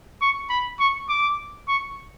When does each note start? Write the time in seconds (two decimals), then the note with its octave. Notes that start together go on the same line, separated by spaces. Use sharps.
0.21 C#6
0.50 B5
0.80 C#6
1.09 D6
1.68 C#6